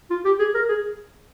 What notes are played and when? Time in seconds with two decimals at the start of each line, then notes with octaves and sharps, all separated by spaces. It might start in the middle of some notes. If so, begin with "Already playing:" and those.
0.10 F4
0.25 G4
0.39 G#4
0.54 A#4
0.69 G#4